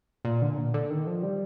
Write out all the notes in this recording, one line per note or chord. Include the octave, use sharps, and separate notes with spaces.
A#2
D3
A#2
D3
D#3
F3
G3